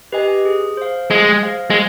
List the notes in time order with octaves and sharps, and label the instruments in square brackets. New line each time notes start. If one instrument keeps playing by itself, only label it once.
[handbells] G4 B4 D#5 G#5
G#4
C5 F5
[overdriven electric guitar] G#3 [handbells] G#4
[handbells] C5 F5
[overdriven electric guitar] G#3